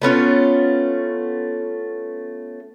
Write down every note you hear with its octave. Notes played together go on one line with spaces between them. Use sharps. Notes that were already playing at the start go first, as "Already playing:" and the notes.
A3 B3 C#4 F4